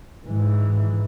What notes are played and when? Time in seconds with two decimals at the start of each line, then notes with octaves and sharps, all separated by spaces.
0.24 G#2 E3